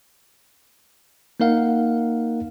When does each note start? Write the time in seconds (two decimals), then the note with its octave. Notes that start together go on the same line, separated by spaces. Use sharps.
1.40 A#3 D#4 A#4 F5 F#5